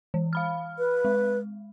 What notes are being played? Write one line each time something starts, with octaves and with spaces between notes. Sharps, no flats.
E3
F5 B5 F6
B4
G#3